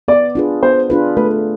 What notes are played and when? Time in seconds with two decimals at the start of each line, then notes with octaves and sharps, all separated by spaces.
0.08 B3 D5
0.35 D4 F4 G#4 B4
0.63 B3 C5
0.90 D4 F4 G#4 B4
1.17 A3 B4